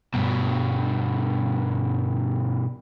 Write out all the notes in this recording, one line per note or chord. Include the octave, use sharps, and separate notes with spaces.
G2 B2